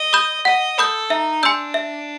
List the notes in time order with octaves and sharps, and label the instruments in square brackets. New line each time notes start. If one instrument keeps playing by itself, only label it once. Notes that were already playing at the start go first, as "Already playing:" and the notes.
Already playing: [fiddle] D#5
[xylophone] B5 D#6 G6
[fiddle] D#5 [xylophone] F#5
[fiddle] A4 [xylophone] B5 D#6 G6
[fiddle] D#4 [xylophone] E5
[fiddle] D4 [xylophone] G#5 C6 E6 G6
[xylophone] E5